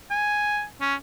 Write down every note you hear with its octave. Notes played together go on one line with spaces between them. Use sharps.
G#5
C#4